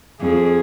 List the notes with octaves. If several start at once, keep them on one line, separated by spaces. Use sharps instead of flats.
F2 G#4